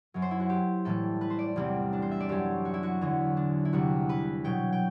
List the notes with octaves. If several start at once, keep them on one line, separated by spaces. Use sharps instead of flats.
F#2 F#3
C5
E4
F#4
G4
A2 E3 G3 A4
B4
C5
D5
E2 C3 G3 C4
D4
C5
E5
D5
F#2 F#3 G4
F#4
E4
F#4
E2 D3 F#3
D4
E4
E2 C3 G3 F#4
B4
B2 F#3 G5
G5